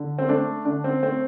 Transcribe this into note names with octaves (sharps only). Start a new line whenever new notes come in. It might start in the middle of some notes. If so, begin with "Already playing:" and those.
Already playing: D3
C4
A3 D4
D3 D4
C4
A3 C4